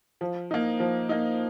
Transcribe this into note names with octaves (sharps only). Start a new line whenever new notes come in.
F3
A#3 D#4
F3
A#3 D#4